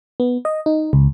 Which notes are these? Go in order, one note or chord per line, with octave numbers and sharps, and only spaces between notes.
B3
D#5
D#4
C#2